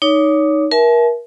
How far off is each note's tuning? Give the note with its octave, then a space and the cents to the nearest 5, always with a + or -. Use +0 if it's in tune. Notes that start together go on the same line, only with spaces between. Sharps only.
D#4 +0 C#5 +25 D6 +0
A#4 +30 E5 +0 A5 -45